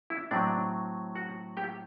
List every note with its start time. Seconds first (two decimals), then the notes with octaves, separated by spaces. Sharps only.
0.10 E4
0.31 A2 F#3 C4 D4 D5
1.15 F#4 F#5
1.57 G4 G5